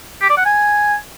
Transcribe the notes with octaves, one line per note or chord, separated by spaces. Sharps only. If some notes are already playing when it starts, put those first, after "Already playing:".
G4
D5
F#5
G#5